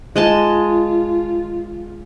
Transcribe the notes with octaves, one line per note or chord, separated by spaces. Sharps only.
G#3 F4 D#5 A5